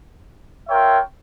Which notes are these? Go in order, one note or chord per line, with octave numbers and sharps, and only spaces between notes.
F4 A#4 C#5 E5 G5